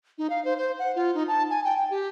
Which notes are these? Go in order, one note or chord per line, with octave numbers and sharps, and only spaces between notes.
D#4
F5
C5
C5
F#5
F4
D#4
A5
G#5
G5
G5
G4